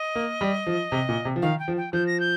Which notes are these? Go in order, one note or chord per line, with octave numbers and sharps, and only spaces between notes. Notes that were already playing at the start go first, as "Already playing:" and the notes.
Already playing: D#5
A#3
G3
F3
C3
A#2
C3
F3
D#3 F5
G5
F3
G5
F3 G6
A#6
G6